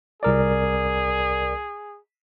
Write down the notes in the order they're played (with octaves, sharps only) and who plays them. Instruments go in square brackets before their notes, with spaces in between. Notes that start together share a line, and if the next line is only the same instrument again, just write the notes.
[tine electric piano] C2 A#4 D5 [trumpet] G#4